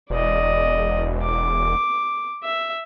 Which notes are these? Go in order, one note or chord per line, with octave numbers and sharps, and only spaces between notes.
E1 D5 D#5
D6
E5